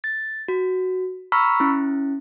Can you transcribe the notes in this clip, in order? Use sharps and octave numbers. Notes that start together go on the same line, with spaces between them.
A6
F#4
A#5 B5 C#6 E6 F6 B6
C#4 E4